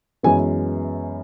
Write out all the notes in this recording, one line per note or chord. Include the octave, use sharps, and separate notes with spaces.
F#2 E3 G#3 B3 G#5